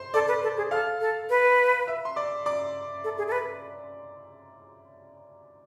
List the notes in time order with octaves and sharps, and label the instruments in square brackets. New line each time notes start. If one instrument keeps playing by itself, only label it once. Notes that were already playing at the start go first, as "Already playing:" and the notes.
Already playing: [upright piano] C5 C6
[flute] A4 [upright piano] D5 D6
[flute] B4
A4
G#4
[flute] A4 [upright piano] F5 F6
[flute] A4
B4
[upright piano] E5 E6
C6
D5 D6
D5 D6
[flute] A4
G#4
A4
B4